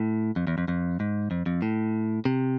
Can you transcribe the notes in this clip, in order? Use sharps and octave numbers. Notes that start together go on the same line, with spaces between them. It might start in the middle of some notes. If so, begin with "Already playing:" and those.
Already playing: A2
F2
E2
F2
F2
G#2
F2
F2
A2
C3